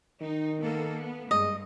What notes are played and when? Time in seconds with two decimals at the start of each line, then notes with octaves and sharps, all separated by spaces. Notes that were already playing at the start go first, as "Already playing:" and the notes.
0.22 D#3 D#4
0.61 A#3 B3 A4
0.96 B3
1.31 G2 G#3 D#5